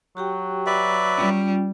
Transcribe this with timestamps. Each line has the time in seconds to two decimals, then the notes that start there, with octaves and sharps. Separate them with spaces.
0.17 F#3 F#4 G4 G5
0.66 B4 D5 E5
1.18 G3 C#4 F4 G5